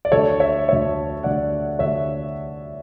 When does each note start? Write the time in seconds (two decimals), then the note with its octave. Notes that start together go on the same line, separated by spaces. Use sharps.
0.05 D5
0.12 D2 D3 A3 A4 C#5
0.40 C#5 E5
0.68 D2 D3 A3 C#5 E5
1.23 D2 D3 A3 D5 F#5
1.79 D2 D3 A3 C#5 E5